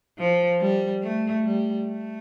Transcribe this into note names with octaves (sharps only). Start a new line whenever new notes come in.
F3
G3
A3
G3
A3